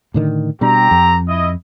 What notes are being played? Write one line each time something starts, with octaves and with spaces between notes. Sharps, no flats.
A2 D3 D#3
B2 G3 C4 D4 G4 A#5
F2
E4 D#5